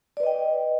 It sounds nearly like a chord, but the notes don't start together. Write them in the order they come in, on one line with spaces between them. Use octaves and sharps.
D5 B4 D#5 G5